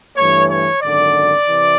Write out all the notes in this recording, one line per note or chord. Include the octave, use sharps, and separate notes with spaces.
G2 E3 A3 C#5
C#5
G#1 F#2 D3 D5
C3 E3